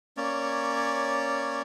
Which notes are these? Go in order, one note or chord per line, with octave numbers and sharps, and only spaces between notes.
A#3 C#4 C#5 D5